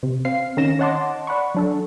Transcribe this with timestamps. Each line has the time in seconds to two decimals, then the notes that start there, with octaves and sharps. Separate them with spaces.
0.03 C3
0.25 C4 F5 C7
0.57 D#3 C#4 D#4 A#6 E7
0.79 C#5 D#5 F#5 A5 C6 D6
1.27 D5 F#5 B5 C#6
1.55 F#3 D4 A4